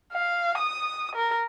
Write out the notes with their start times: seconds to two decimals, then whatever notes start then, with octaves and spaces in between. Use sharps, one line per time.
0.13 F5
0.58 D#6
1.16 A#4